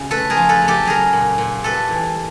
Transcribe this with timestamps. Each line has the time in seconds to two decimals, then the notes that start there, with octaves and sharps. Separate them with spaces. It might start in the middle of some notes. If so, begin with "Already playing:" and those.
Already playing: C#3
0.11 A3 A4 B4
0.30 G#4 A#4
0.37 F3
0.49 A4 B4
0.62 C#3
0.68 G4 A4
0.85 F#3 G#4 A#4
1.13 A#2
1.38 A#2
1.63 G3 A4 B4
1.90 E3